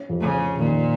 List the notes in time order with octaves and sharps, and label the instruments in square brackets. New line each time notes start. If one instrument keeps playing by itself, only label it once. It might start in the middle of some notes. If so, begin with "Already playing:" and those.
Already playing: [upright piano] C#4
F2
[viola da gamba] C#3
[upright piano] C#4
[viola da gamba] A#2 [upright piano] D#3